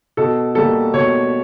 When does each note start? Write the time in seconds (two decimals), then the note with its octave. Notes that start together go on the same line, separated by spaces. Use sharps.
0.17 B2 A4
0.55 G3 A#3 A4
0.94 B2 C#5